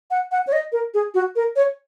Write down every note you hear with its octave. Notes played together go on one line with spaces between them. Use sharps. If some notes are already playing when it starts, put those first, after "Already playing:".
F#5
F#5
C#5
D#5
A#4
G#4
F#4
A#4
C#5